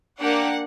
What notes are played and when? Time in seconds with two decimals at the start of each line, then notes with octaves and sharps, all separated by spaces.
0.19 A#3 D4 G4 F#5